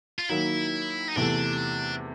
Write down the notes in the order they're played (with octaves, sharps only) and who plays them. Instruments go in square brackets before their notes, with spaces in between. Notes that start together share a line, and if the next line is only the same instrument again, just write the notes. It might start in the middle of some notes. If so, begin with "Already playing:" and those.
[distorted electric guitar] F4
[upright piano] D#3 F#3 A#3 [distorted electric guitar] E4
[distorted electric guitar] D#4
[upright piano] E2 C3 E3 A3 [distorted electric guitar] D4